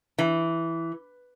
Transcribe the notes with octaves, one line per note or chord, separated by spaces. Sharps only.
E3